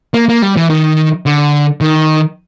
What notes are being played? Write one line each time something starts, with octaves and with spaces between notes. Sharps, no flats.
A#3
A#3
G3
E3
D#3
D3
D#3